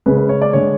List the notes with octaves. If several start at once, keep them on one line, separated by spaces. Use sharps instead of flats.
C#3 G#3 C#4 B4
B4
C#5
D5
D3 G#3 C#5